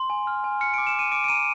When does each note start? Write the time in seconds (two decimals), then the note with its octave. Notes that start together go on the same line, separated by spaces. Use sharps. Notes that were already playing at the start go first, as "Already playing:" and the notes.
Already playing: C6
0.10 G#5
0.27 F6
0.44 G#5
0.61 F6 C#7
0.74 D7
0.78 D6
0.87 E7
0.95 D6 D#7
1.11 D6 D7
1.24 D7
1.28 A#5 D#7